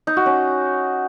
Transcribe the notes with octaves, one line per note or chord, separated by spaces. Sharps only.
D#4
F#4
C#4